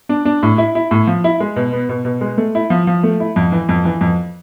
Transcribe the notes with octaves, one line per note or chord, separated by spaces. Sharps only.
D4
D4
A2
E4
E4
A2
F3
E4
G#3
B2
B3
B2
B2
G#3
A3
E4
F3
F3
A3
E4
F2
E3
F2
E3
F2